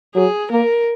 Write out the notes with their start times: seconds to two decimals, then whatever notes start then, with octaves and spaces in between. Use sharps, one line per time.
0.15 F#3 G#4
0.51 A#3 A#4